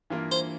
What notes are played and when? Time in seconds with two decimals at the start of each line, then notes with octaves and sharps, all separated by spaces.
0.10 G2 E3 A#3 F4 A#4
0.32 C5